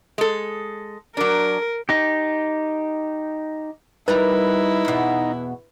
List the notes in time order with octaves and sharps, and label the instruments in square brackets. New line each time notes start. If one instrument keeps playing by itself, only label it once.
[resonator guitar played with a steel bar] G#3 A4
[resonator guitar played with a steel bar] F#3 D4 [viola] A#4
[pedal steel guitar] D#4 G4
[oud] G3 A#4 [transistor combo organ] D#4 [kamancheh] E4 [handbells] B4
[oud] E2 B2